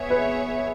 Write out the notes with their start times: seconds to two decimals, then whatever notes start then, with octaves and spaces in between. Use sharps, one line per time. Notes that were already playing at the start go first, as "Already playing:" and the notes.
Already playing: B3 G#4 C#5 E5
0.10 B4